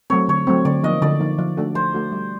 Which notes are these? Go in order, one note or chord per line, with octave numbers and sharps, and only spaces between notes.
F#3 A3 C4 C#5
D3 C#5
F#3 A3 C4
D3 D5
F3 A#3 D#4 D#5
D3 D5
F3 A#3 D#4
F3
A3 D4 F#4 A4
F3 C5
A3 D4 F#4 A4
G3